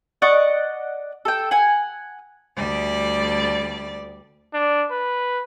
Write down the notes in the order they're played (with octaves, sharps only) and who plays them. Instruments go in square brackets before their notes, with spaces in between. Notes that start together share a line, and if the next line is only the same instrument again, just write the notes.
[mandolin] D5 D#5 F#5 C#6
A4 G5
F#5 G#5
[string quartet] D2 G3 D5
[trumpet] D4
B4